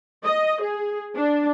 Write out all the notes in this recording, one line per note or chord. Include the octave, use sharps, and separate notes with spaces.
D#5
G#4
D4